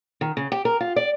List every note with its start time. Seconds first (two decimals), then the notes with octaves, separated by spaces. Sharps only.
0.21 D#3
0.37 C#3
0.52 G4
0.65 A#4
0.80 F4
0.96 D5